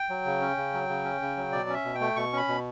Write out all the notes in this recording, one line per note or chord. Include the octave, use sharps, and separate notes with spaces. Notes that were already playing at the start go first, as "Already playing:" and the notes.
Already playing: G5
F#3
C#3
C#4
C#3
F#3
C#3
C#4
C#3
F#3
B2 D5
C#4 E5
B2
G5
A3
B2 C#6
C#4 B5
B2